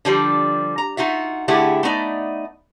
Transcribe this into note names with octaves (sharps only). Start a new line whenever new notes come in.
D3 F3 G3
A#5
D#4 F4 F#4 E5
D3 A3 E4 G4 G#4 F#5
A3 B3 D#4 D5